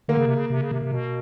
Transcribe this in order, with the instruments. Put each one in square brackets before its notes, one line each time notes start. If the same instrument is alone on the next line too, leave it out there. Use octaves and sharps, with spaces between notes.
[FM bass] D3 [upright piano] A#3
[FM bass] C#3
C3
C#3
C3
C#3
C3
C3
B2